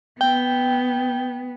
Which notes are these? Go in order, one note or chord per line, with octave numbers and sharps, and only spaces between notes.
B3 G5